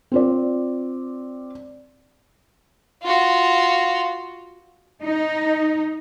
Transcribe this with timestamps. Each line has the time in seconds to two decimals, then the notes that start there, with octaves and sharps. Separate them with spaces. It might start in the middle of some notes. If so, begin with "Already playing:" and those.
0.12 C4 F4 D5
3.03 F4 F#4
5.02 D#4